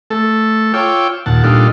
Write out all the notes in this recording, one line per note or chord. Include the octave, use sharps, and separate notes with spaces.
A3 A4
F4 C#5 G5 D6 E6
D#2 A#2 F#5 A5
A#2 G3 D4 D#4 F4 A4